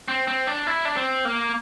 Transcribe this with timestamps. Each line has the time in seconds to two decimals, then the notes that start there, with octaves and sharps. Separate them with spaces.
0.08 C4
0.28 C4
0.47 D4
0.67 E4
0.85 D4
0.96 C4
1.25 A#3